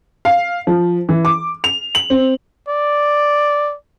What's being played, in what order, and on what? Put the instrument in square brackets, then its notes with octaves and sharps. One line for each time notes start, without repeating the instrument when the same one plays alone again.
[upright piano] F5
F3
E3
D6
F7
F#7
C4
[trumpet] D5